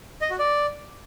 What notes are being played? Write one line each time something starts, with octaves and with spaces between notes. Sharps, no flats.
D#5
F#4
D5